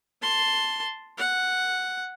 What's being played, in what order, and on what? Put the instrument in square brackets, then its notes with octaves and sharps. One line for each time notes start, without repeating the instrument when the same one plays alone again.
[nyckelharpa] A5 C6
F#5